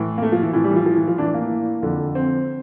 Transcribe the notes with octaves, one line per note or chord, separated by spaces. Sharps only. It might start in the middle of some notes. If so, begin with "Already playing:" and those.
Already playing: A2 E3
A#3
A3
F3
E3
A2 E3 F3
G3
E3
F3
F3
E3
F3
A2 E3 D4
A#3
F2 D3
C4